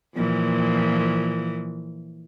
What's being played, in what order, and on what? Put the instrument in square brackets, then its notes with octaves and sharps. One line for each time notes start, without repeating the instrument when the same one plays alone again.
[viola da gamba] A#2 E3 F3